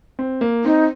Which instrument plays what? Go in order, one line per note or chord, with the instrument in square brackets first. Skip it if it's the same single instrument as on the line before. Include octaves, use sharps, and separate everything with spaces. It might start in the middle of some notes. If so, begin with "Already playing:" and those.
[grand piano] C4
A#3
[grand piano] C4 [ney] D#4